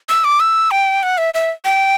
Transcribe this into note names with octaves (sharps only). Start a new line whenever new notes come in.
E6
D6
E6
G5
F#5
E5
E5
G5